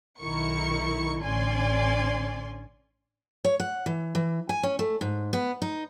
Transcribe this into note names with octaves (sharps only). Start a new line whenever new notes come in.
B1 D#3 E4 A#4 C#6 C#7
A1 D3 C#4 D5 G#5 C6
C#5
F#5
E3
E3
G#5
C#4
A3
G#2
B3
D#4